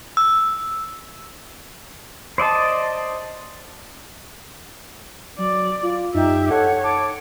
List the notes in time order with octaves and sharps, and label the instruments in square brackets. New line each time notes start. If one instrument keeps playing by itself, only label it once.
[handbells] E6
[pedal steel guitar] C5 D5 D#5 A5
[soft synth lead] F#3 [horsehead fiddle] D5
[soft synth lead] F4
[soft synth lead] F#2 [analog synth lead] D#4 [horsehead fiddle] G4 E5
[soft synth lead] A4 [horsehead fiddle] C#5 [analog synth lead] F#5
[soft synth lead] A5 [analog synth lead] D6